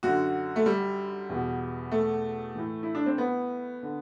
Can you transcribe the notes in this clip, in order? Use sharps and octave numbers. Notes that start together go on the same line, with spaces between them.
F#2 D3 F#4
A3
G3
E2 B2
A3
A2 E3
E4
D4
C4
B3
D3